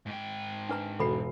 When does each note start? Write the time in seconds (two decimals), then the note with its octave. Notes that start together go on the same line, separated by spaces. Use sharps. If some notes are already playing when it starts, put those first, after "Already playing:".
0.07 G#2 G5
0.69 D4 B4 A#5
1.00 E1 F#4 A4 B5 C7